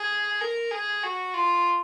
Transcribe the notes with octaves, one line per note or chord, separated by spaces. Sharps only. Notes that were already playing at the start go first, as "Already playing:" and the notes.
Already playing: G#4
A#4
G#4
F#4
F4